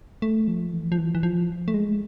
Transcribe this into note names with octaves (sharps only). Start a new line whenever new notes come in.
A3
F3
E3
F3
E3
E3
F3
A3
G#3